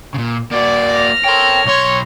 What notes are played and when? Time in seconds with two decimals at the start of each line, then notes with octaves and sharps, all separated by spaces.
0.14 A#2 C#3
0.51 A#3 F#4 D5
0.93 F6 A#6
1.24 A4 A#4 C#5 G5 C6
1.65 B1 C#5 C6